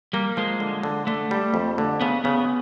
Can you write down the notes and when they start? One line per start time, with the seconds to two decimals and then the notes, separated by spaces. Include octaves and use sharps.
0.13 G3 A#3
0.37 F3 G#3
0.60 D3
0.83 D3
1.07 D3 A3
1.31 G3
1.54 F2
1.78 D3
2.01 C#3 B3
2.24 C#3 B3